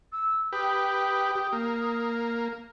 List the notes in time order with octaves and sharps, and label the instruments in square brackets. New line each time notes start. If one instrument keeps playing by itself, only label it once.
[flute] E6
[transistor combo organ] G4 B4 [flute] D#6
[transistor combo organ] G4
A#3